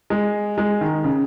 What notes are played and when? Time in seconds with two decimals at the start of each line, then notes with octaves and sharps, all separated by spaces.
0.10 G#3
0.58 G#3
0.81 D#3
1.04 C#3